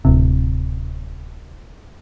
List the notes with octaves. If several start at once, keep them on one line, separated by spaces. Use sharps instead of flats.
D1 C3